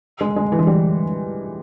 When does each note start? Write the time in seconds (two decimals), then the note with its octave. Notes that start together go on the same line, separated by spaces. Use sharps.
0.21 G#3
0.36 G#3
0.52 E3
0.59 G#3
0.67 G3